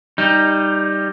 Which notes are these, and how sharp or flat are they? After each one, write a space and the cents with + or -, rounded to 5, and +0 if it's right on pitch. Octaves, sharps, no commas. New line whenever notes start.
G3 +5 D#4 +0